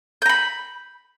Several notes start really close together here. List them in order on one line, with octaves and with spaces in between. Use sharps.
G6 A#5 B5